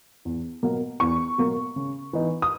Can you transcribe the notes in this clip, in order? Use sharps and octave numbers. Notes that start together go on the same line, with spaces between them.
E2
B2 F#3 A#3
E2 C#6
B2 F#3 A#3
C#3
E3 B3 D#4
D#6